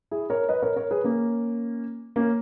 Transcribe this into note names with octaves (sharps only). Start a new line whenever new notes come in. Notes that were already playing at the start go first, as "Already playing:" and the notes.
E4 G#4
A#4 C#5
B4 D#5
A#4 C#5
A#4 C#5
G#4 B4
A#3 C#4
A#3 C#4